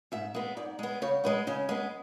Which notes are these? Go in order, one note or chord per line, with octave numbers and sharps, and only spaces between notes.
G#2 E5
G#3 B3
G#2 D5
G#3 B3
C#3 C#5
G#3 B3 B4
C#3 C#4
G#3 B3